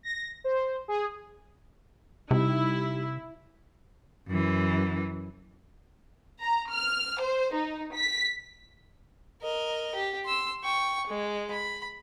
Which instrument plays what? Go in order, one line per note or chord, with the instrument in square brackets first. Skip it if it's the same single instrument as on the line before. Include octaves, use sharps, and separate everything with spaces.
[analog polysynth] A#6
C5
G#4
[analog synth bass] C3 [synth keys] G3 D#4 G4 [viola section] E4
[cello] F#2 E3
[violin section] A#5
F6
C5
D#4
B6
[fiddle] A#4 D#5
G4
C6 E6
G5 C#6
G#3
B5